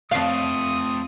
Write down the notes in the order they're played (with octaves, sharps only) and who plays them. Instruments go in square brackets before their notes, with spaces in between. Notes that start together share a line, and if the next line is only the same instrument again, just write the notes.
[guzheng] F2 F4 [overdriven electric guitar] A3 C4 [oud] F5 [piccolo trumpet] D#6